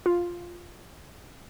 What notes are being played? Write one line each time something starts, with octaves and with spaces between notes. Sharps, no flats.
F4